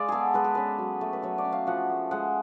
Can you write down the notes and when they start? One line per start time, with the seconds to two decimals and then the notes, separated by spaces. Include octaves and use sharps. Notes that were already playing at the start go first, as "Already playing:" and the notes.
Already playing: G#3 D5 F5
0.09 B3 G#4 A4
0.34 G#3 B4
0.44 A4
0.55 C#4 B4
0.78 F#3
1.01 A3
1.13 B4
1.22 F#3 C#5
1.38 D5
1.45 C#4
1.52 F5
1.67 F3 F#5
1.89 A3
2.11 G#3 F#5